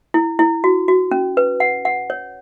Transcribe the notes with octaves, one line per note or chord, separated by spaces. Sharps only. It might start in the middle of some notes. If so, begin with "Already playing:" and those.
E4
E4
F#4
F#4
C#4
B4
F#5
F#5
C#5